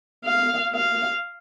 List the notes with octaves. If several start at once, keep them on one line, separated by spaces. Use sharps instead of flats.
F5
F5